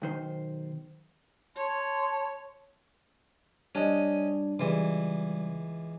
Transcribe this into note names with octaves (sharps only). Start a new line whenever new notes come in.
B1 D#3 C5
C#5 A5 C6
G3 C#4 D4 D#5
C#2 C#3 E3 G3